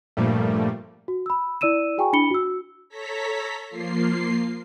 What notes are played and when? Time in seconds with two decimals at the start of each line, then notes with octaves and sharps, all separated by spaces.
0.17 G2 A#2 F3 G3 A3
1.08 F#4
1.26 B5 E6
1.61 E4 D5 E6 D#7 E7
1.98 F#4 G#4 G5 G#5 A#5 C#6
2.13 D4 E4 B5 C#7 G7
2.31 F#4 E6
2.89 A4 C#5 A#5 B6
3.69 F3 A#3 F4 C7